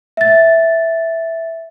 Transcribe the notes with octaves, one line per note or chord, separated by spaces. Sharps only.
E5 A6